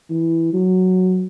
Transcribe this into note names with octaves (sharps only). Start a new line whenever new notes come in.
E3
F#3